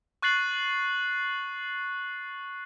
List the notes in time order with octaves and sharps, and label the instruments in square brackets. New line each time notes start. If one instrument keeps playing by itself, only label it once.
[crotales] C#6 F#6 A6 C7 F#7